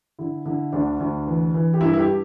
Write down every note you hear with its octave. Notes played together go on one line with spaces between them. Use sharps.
D3 E4
D3 E4
D2 D4
D2
E3
E3
G4
G2 E4
E4
G4